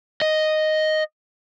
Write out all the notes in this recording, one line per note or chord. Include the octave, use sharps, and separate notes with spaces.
D#5